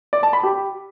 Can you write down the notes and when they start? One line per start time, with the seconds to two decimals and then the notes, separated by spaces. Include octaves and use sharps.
0.13 D5
0.23 A5
0.33 B5
0.43 G4